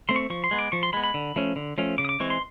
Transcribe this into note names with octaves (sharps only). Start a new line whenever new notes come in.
A3 C4 C6
C#6
F3 C#6
C6
G#3 B3
D6
F3 C#6
C6
G#3 B3 B5
B5
D3
F3 A3 C#4
D3
F3 A3 C#4
C#3 D6
D#6
D6
E3 G#3 C4 C#6
C6